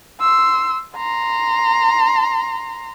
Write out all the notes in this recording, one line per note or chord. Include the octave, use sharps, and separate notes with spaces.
C6 E6
A#5 C6